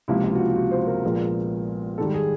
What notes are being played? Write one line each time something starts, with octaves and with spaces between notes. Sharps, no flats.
C#2 C3 F3 A#3 E4
F4
F#4
F4
F#4
C5
A#4
A#1 A#2 F3 G#3 B3
G#2 D#3 G3 A4
G#4